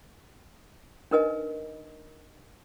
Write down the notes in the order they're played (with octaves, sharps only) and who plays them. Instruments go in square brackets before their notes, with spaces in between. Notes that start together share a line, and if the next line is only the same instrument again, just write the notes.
[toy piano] D4 D#4 A#4 B4 D#5 G#5